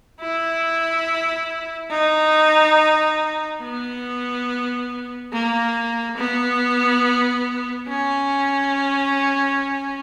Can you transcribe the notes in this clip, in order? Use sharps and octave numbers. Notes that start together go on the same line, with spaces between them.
E4
D#4
B3
A#3
B3
C#4